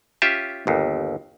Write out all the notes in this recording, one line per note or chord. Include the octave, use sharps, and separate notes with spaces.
C#4 F4 G4 E5
G1 D#2